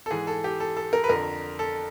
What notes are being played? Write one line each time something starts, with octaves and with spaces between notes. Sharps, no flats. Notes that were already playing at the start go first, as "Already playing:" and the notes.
A4
G#2 E3 G#4
A4
G4
A4
A4
A#4
B4
F2 D3 A#4
A4